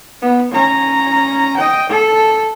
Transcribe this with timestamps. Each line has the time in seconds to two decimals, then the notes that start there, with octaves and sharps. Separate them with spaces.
0.22 B3
0.51 C#4 A#5
1.57 D#5 G5
1.89 A4